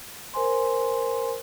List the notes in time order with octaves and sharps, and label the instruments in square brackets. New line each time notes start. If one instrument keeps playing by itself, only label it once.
[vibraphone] A#4 C5 G#5 C6